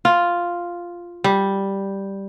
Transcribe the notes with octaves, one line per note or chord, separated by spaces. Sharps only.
F4
G3